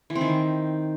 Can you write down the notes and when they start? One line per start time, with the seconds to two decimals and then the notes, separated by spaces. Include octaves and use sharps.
0.10 E3
0.15 C4
0.21 D#3